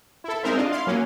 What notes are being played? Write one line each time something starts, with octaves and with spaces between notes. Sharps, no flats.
E4 A4
G#3 C4 D#4 A#4 C5 E5
D4 F4 D#5
E4 F5 C6
F#3 A#3 C#4